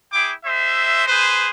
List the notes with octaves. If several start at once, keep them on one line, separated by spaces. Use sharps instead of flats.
E4 G#4 G5 D6
G#3 C5 E5
G#4 B4 C5